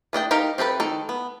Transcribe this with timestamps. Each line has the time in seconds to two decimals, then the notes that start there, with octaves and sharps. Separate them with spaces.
0.13 A3 D4 D#5 G5
0.31 D#4 G4 A#4 F5 G5
0.58 C4 G4 A4 B4
0.80 D#3 A4
1.09 B3